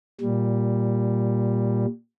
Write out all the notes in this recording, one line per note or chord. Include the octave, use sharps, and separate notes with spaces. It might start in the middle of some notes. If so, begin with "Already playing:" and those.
A#2 G3